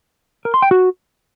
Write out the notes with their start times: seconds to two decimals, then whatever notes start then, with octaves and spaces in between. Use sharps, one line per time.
0.45 A#4
0.54 C6
0.62 G5
0.71 F#4